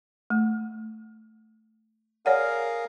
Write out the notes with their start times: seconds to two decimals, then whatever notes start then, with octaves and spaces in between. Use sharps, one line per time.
0.30 A3
2.26 G#4 A#4 C#5 D5 F5 F#5